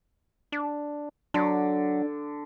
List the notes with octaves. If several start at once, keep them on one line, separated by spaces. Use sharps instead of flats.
D4
D3 F#3 D4